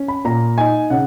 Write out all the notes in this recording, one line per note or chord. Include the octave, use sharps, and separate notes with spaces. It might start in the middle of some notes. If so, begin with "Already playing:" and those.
Already playing: C#4
B5
A#2 A#5
D#4 G#5
C#3 F#5